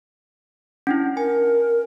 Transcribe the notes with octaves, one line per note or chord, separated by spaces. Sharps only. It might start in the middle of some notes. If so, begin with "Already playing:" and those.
C#4 D4 E4
A#4 G#5